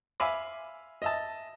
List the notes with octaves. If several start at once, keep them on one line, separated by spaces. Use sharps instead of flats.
E5 F5 G#5 B5 D6
D#5 E5 A5